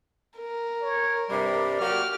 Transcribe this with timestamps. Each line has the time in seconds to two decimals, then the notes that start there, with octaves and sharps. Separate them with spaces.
0.38 A#4
0.82 C#5
1.29 G2 C3 G3 D5
1.80 F#3 A#3 G4 F6